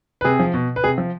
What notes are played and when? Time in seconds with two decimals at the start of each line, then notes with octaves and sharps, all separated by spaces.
0.21 B4
0.25 C3 G#4
0.39 F3
0.54 B2
0.76 B4
0.84 C3 G#4
0.98 F3